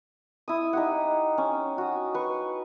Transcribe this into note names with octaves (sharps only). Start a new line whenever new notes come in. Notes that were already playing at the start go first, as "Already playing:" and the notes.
E4 D#6
D#4 G4 F#5
C#4
F#4 D#6
B4 C#6